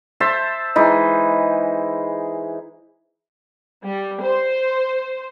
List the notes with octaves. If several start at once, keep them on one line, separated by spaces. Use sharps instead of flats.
C5 E5 A5
E3 G#3 D#4
G3
C5